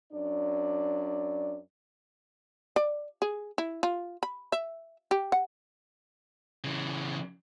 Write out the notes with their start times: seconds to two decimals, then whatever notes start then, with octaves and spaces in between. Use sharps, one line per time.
0.12 F#2 D4 D5
2.76 D5
3.22 G#4
3.58 E4
3.83 F4
4.23 B5
4.52 E5
5.11 G4
5.32 F#5
6.64 C#3 E3